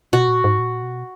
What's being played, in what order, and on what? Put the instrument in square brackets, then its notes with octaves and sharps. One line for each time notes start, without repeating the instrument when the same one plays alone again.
[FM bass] B2 [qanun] F#4
[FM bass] A#2
G#2
A#2
B2